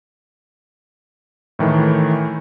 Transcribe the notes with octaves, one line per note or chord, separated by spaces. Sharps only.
A2 D#3 E3 A3